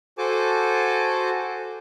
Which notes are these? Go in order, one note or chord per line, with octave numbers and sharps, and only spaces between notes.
F#4 A4 C5 G#5 A5 D6